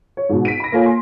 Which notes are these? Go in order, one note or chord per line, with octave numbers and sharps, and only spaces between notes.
C#5
G#2 B2
B6 D7 D#7
B5 A#6
A#3 F4 A4 C#5 G#5
C6